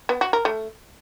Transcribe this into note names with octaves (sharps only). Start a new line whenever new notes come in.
B3
F#4
A#4
A3